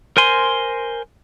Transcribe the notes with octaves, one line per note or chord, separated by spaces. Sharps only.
A#4 C5 G#5 C6